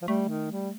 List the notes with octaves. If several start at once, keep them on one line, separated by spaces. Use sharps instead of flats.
F3
G3 A3
D#3
G3